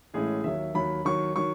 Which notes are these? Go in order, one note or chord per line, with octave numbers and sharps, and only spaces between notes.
A1 A2 G#3 C#4 G#4
D#2 D#3 F#3 E5
D#2 D#3 F#3 B5
D#2 D#3 F#3 C#6
D#3 F#3 C#6